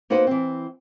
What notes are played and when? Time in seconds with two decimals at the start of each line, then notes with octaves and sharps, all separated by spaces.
0.10 A#3 B3 D#4 F#4 B4 C5
0.27 E3 C4